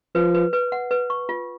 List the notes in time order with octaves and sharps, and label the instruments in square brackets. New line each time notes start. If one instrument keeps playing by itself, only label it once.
[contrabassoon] F3 [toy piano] B4
[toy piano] B4
B4
F#5
B4
C#6
F4